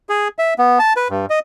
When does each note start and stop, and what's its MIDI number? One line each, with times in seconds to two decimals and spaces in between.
0.09 0.28 68
0.39 0.54 76
0.59 0.79 59
0.79 0.93 81
0.97 1.08 71
1.10 1.26 43
1.30 1.39 75